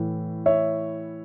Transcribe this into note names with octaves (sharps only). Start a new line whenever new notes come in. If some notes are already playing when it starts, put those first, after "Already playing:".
Already playing: A2 E3
C#5 E5